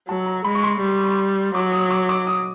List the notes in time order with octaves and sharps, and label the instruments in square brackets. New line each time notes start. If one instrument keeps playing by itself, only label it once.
[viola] F#3 [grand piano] A5
[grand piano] A#5
[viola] G#3 [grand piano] B5
[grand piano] C#6
C6
[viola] G3
[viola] F#3 [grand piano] D6
[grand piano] D#6
D6
D6
D#6